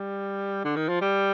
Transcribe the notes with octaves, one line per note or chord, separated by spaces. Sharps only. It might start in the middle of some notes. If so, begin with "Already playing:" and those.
Already playing: G3
D3
D#3
F3
G3